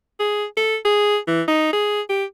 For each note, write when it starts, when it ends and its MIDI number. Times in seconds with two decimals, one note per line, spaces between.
0.20 0.45 68
0.57 0.77 69
0.85 1.18 68
1.28 1.42 52
1.48 1.72 63
1.73 2.01 68
2.09 2.24 67